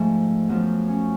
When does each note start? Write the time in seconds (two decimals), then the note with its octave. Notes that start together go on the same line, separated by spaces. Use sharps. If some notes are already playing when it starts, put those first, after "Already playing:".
Already playing: G#2 F3 A3
0.49 F#2 F3 B3
0.88 C#4